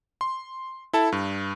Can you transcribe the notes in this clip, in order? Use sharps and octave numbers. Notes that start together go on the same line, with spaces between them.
C6
E4 A4 A5
G2